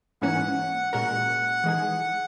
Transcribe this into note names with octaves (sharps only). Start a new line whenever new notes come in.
G#2 E3 A#3 C#4 F#5
A#2 G#3 C#4 F#4 A#4 F#5
E3 G#3 D#4 G#4